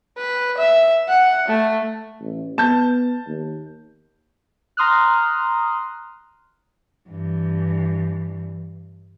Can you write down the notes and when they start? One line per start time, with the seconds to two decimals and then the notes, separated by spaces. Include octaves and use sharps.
0.17 B4
0.57 E5
1.08 F#5
1.48 A3
2.21 A1
2.58 B3 A5 G6
3.27 D#2
4.77 A#5 C6 D#6 F6 F#6
7.09 G2 E3